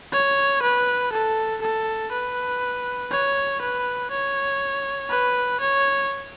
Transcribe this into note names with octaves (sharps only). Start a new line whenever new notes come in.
C#5
B4
A4
A4
B4
C#5
B4
C#5
B4
C#5